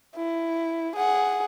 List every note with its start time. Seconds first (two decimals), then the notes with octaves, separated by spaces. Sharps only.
0.16 E4
0.96 G#4 F#5